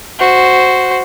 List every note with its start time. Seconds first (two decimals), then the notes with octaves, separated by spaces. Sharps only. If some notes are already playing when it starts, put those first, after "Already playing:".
0.19 F#4 C5